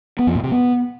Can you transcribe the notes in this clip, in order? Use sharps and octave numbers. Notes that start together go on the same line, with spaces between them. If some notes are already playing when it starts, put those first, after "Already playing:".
B3
F2
A#2
C3
B3